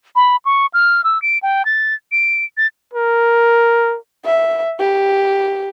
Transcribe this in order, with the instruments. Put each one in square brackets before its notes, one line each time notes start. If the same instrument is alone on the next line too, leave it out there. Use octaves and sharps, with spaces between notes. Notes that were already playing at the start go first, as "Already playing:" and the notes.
[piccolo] B5
C#6
F6
E6
D7
G5
A6
D7
A6
[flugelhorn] A#4
[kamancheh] E5
G4